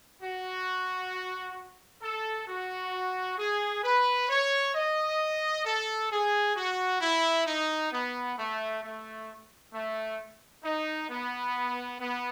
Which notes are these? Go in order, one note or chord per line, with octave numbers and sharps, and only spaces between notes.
F#4
A4
F#4
G#4
B4
C#5
D#5
A4
G#4
F#4
E4
D#4
B3
A3
A3
A3
D#4
B3
B3